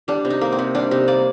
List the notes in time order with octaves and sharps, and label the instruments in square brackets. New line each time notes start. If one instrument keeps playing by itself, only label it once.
[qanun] G3 D4
C3
D#4
A#3
C4
C3
G3 D4
C3 D#4
A#3 D5